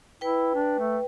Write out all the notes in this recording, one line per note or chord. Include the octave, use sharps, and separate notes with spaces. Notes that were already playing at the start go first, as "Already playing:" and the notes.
E4 B4 G5
D4
A3